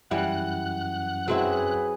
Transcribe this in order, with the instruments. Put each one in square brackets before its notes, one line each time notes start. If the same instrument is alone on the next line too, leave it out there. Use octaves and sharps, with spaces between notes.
[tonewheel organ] F#2 F#6 [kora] E3 G3 [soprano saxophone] F#5
[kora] F#3 C4 E4 [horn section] G#4 B4